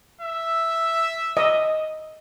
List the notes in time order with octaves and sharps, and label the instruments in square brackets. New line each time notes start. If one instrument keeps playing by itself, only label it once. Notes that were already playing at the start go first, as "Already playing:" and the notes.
[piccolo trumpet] E5
[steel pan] D#5